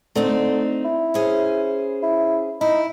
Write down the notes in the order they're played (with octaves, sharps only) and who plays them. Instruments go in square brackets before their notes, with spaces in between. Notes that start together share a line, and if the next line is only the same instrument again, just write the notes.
[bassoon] D3 [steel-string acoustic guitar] A3 C4 D#4
[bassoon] E4
[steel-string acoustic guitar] C#4 G#4 C5
[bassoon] E4
[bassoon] D#4 [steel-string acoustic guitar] E4